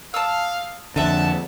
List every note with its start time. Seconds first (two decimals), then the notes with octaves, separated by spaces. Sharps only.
0.14 F5 A5 D#6 E6
0.96 F2 D3 D#5 E5 F#5 A5